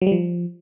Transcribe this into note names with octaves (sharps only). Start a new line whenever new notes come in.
F#3
G3
F3